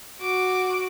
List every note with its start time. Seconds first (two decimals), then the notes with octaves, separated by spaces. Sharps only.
0.21 F#4 D6